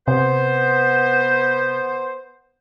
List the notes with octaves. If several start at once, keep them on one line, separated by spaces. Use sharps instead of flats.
C3 B3 C5